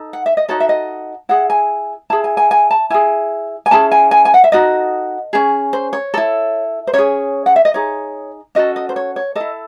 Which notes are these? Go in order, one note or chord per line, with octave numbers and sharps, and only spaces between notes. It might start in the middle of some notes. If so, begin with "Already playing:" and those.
Already playing: D#4 A4
F#5
E5
D#5
D#4 F#4 A4 C#5
E5
D#5
E4 G#4 F#5
G#5
E4 G#4 A5
G#5
G#5
G#5
A5
E4 G#4 G#5
G#5
C#4 E4 G#4 A5
G#5
G#5
G#5
F#5
E5
D#4 F#4 A4 D#5
C#4 G#4
C5
C#5
E4 A4
C5
C#4 G#4 C#5
F#5
E5
D#5
D#4 G#4 C#5
C#4 F#4 A4 D#5
D#5
C5
C#5
C#5
E4 A4 D#5